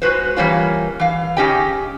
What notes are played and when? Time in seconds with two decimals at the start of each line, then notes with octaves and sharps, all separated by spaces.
0.02 G#3 F#4 B4 C5
0.36 E3 G3 A#3 C#4 F4
1.00 E3 F5
1.37 C#3 G#3 C#4 G4 D#5 G5